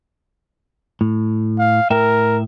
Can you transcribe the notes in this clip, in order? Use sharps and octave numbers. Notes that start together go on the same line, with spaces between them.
A2
F5
A2 A#4 E5 G5